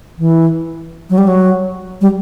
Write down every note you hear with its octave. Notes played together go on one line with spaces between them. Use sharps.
E3
F#3
G3
F#3
G3